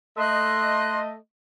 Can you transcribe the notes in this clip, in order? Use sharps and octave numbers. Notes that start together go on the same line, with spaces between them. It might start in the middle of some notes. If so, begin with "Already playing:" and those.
A3 D#5 C6 F#6